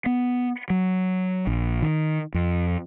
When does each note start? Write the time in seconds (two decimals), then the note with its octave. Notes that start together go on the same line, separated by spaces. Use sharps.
0.06 B3
0.70 F#3
1.47 A#1
1.82 D#3
2.34 F2